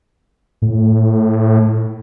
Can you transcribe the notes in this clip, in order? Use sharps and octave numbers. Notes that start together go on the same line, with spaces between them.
A2